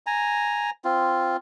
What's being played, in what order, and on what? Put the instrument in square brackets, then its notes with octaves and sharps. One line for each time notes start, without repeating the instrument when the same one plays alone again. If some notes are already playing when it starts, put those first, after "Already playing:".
[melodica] G#5 A#5
C4 F4